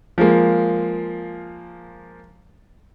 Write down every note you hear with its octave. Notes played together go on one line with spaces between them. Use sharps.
F3 G#3 A#3